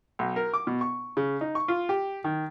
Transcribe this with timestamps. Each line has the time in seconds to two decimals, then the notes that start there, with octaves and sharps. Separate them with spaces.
0.19 B1
0.36 A#4
0.54 D6
0.67 B2
0.81 C#6
1.17 C#3
1.41 D#4
1.55 C#6
1.68 F4
1.89 G4
2.24 D#3